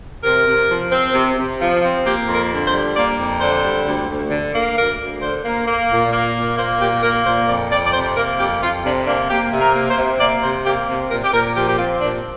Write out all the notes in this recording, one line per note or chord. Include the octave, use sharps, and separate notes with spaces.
C3 A#4
C3
F3
C4
C3
C3
F3
C4
A#3 G4
F2
A#4
D3
C5
G3
A#3 D5
F2
D3 C5
G3
D2
D2
D3
A#3
D2 A#4
D2
D3 C5
A#3
A#3
A#2
A#3
A#2
A#3 C5
A#2 G4
A#3 A#4
A#2 C5
F2 D5
F2 D5
D5
C3 C5
A#3 A#4
F2 G4
F2 F4
C3 D4
A#3 D4
A#3 G4
C3
A#4
A#3
C5
C3
A#3 D5
C3 C5
A#3 G4
C3
A#2 A#4
G4
A#2 A#4
F3 G4
G4
C4 F4
A#2 D4